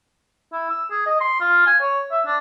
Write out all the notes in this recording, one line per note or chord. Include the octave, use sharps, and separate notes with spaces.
E4
E6
G#4
D#5
C6
F4
G#5
C#5
E5
D4